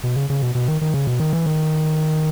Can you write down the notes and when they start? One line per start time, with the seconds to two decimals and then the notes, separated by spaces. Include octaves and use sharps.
0.03 B2
0.16 C#3
0.30 C#3
0.42 B2
0.55 B2
0.68 D#3
0.81 D#3
0.94 C#3
1.07 B2
1.20 D#3
1.33 E3
1.46 D#3